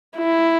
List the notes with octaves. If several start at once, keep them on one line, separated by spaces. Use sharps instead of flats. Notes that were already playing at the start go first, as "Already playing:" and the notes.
E4